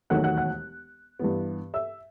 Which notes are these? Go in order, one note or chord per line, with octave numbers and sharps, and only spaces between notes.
E1 D#2 D#3 F#3 A3 F#5 F#6
F#5 F#6
F#5 F#6
G2 E3 B3
E5 E6